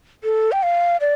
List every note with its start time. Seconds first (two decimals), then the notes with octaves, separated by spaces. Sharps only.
0.24 A4
0.52 G5
0.63 F5
1.01 D5